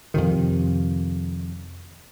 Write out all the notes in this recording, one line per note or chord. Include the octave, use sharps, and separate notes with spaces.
F2 C3 D#3